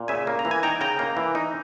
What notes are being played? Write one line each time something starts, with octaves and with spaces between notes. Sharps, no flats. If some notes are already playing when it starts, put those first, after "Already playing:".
Already playing: A#2
C#3 E5 G#5
A#3
A#5
E3
G#5
D#4 G5 A#5
C#3 G5 A#5
A#3
E3
D#4